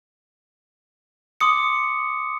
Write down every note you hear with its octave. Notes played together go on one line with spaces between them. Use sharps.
C6 D6 D#6 C#7